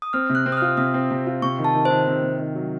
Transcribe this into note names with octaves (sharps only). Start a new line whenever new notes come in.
D#6
C4 F6
C3
F#6
C4
D#6
F6
F4
C3 D#6
C4
C3
F4
C3 C#6
D#3
A5
D#3
D#3 C5
C3
C3
D#3
F#3